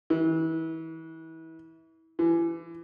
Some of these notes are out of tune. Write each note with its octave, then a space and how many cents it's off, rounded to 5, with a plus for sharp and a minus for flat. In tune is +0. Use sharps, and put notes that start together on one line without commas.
E3 -30
E3 +25